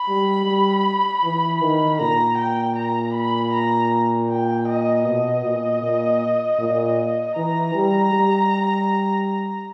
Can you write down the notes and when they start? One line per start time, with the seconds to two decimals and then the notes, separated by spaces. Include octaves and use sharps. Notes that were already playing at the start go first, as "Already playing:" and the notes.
Already playing: B5
0.08 G3
0.46 G3
1.24 E3
1.61 D#3
2.00 A#2 A#5
2.38 G5
2.77 A#5
3.14 B5
3.53 A#5
4.30 G5
4.68 D#5
5.06 B2 D#5
5.44 A#2
5.83 A#2
6.60 A#2
7.36 E3 A#5
7.75 G3
8.13 G3